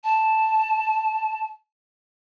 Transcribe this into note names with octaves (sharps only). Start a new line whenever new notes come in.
A5